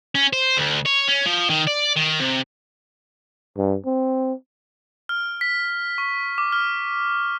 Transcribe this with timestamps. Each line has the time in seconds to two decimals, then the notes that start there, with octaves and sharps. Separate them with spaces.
0.15 C#4
0.33 C5
0.57 D2
0.86 C#5
1.08 C#4
1.26 F3
1.50 D#3
1.67 D5
1.96 D#3
2.20 C3
3.57 G2
3.86 C4
5.09 F6
5.41 B6
5.98 C#6
6.38 D6
6.52 F6